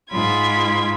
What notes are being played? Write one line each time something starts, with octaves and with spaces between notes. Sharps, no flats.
G#2 F4 B5 G#6